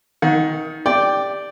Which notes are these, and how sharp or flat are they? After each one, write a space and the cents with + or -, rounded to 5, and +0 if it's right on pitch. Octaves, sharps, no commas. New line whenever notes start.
D#3 +15 F#5 -25
G4 +25 D5 +0 G5 -5